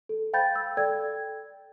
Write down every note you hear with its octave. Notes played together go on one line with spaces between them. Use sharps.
A4
C5 F5 G5 B5 G6 A6
E6
A4 D5 G5 G#6